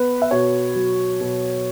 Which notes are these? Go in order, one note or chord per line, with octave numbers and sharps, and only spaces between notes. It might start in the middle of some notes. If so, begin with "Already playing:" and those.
Already playing: B3 B4
E5
B2 C#5
F#3
B2